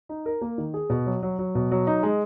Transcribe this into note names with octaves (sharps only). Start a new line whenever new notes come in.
D#4
A#4
A#3
D#3
G#4
B2
F#3
F#3
F#3
B2
F#3
D#4
G#3